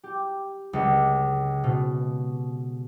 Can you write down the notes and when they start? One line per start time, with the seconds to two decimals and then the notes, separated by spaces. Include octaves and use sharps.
0.04 G4
0.73 C#2
1.64 B2